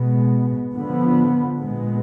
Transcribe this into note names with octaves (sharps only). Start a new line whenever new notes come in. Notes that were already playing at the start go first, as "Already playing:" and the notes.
Already playing: B2 G#3 B3
D3 F3 B3
A#2 G#3 B3